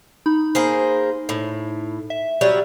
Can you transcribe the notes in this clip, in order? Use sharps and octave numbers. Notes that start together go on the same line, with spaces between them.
D#4 B5
A#3 G#4 C5
A2
E5
F#3 G3 C#5